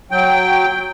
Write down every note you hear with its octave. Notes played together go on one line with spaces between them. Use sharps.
F#3 G5